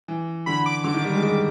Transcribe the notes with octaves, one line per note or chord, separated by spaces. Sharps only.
E3
D3 B5
D6
D3 D6
D#3
G3
G#3
G3